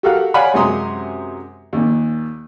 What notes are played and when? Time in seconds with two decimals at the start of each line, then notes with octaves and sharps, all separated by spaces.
0.03 F#4 G4 A4 A#4 F5 F#5
0.34 C#5 D5 F5 F#5 G#5 B5
0.54 F#2 C3 G#3 A#5 C6 D#6
1.73 D#2 A#2